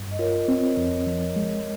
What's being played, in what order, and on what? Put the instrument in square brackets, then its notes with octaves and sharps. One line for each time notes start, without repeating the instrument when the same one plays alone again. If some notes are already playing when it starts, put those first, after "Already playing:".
Already playing: [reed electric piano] G2
[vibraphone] D#5
[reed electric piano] F4 [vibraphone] A#4 C#5
[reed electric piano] C4
F2
F3
G#3